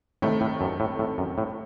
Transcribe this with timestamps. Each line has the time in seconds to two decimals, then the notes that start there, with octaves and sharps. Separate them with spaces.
0.22 A2 C3 D#3 A3
0.41 A2
0.61 F#2
0.80 A2
0.99 A2
1.18 F#2
1.38 A2